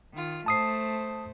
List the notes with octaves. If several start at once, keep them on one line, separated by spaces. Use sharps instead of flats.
D#3 F4
A3 C5 A5 D#6 C7